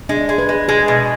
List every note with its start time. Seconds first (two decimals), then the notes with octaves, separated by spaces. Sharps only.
0.09 G#3 D4
0.29 G#3
0.38 B4
0.49 G#3
0.68 G#3 G#4
0.88 B2